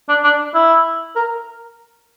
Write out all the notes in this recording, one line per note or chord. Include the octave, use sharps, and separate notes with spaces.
D4
D4
E4
A#4